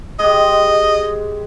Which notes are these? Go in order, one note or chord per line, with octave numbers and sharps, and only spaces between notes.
G#3 G4 D#5